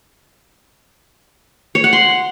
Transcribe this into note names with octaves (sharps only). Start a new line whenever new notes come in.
C#5
F#5
C6